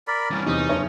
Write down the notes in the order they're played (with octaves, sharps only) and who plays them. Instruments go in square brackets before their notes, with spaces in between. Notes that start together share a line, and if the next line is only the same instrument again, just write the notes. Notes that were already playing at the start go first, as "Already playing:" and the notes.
[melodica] A#4 D5 B5
[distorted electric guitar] G2 E3 [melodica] C#4
[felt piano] E2 C3 D#6 [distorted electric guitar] D#4
[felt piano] F#1 D4 C#5